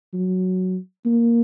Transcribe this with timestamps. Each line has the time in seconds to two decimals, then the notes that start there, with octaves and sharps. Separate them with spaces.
0.14 F#3
1.06 A#3